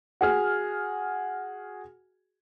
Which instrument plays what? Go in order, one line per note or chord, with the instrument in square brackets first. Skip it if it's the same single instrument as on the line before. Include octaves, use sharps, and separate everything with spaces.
[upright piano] F#4 G#4 F6